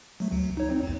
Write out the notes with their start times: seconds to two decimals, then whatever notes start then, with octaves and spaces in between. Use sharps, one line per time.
0.20 F#3 A3
0.32 D2 F#3
0.57 D#4 C#5
0.70 C4 D#4
0.83 A1 E2